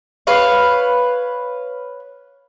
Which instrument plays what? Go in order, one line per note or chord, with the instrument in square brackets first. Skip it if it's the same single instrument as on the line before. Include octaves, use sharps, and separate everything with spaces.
[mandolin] B4 C#5 F5